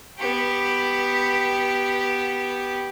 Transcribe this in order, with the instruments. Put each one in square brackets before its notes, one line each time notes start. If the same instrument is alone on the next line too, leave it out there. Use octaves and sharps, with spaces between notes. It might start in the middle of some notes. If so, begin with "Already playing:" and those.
[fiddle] B3 G4